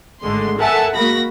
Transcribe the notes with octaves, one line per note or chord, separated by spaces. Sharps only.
G#1 D3 G#3 A3 C6
A4 A#4 E5 F#5 G#5 A5
G#3 A#3 F#4 B5 A#6